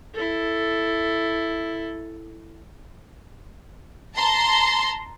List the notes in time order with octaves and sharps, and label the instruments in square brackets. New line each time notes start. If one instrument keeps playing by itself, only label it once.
[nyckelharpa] E4 A4
[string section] A5 A#5 C6